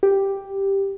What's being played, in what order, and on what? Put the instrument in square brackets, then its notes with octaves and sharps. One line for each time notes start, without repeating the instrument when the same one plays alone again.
[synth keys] G4